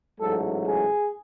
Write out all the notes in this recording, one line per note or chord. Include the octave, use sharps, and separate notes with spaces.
A1 G#2 F#3 A3 A4
G#4